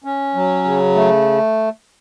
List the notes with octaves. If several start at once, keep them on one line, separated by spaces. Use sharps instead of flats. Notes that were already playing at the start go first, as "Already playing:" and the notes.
C#4
F#3
C#3
A3